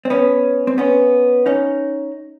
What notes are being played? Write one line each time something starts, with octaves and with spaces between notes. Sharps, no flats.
C4
B3 C#4
C4
B3 C#4
C#4 D#4